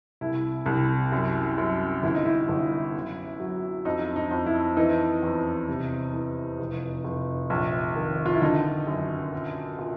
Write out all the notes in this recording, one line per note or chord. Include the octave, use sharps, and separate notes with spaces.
C2 E4
C2
F#2
F#2
G1 E4
D#4
E4
G1
F#2
F#3
F2 D#4
D#4
F2
E4
E3 D#4
E2
C3
E3
F1
F1
A#1
D#3
F4
E4
D3 D#4
F#2
A#2
A#2